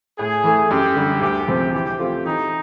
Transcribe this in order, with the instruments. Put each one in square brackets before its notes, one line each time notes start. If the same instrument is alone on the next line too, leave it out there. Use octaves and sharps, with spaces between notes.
[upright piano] A2 [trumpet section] G#4
[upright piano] E3 A3
[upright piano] F#2 [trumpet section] G4
[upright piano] D3 G3
[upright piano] D2 [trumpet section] G4
[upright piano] C3 F3 G#3 C4
[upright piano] E3 [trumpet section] G4
[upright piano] A3 C4 F4
[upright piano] E3 [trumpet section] D#4